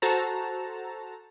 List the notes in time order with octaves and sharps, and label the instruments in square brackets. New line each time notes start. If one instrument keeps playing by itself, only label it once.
[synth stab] F#4 A4 C5 A5 A#5